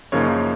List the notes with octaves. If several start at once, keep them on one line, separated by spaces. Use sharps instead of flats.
F#2 C#3 F3 A#3 D#4 C#5